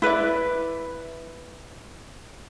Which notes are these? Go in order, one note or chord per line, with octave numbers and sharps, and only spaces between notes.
E4 B4 D5 E5